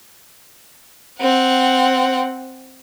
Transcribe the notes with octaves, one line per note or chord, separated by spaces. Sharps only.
C4 F#5